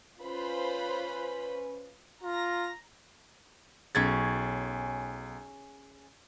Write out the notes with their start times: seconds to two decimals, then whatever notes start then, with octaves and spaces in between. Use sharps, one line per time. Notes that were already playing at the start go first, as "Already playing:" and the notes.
0.21 C#4 F4 B4 C5 B5
2.23 F4 A#5 A#6
3.95 B1 C#4 G#4 G#6 A6